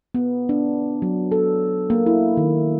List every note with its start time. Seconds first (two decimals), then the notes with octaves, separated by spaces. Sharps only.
0.14 B3
0.49 D4
1.02 F#3
1.32 A4
1.90 A#3
2.06 E4
2.37 D#3